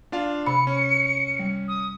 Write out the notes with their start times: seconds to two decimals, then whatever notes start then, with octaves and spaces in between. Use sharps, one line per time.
0.12 D4 F4 F5
0.46 C3 B5 C#7
0.67 C#4
1.39 G3
1.68 D#6